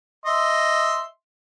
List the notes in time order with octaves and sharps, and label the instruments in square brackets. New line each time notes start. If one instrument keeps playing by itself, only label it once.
[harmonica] D#5 E5 C6